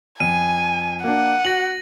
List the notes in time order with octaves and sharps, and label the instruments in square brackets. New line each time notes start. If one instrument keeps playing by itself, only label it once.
[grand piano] F2 [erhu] G#5 [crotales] D#7
[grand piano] A#3 D4 [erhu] F#5
[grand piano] F#4 [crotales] A#6 F#7